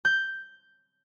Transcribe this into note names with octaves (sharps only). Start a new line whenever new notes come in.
G6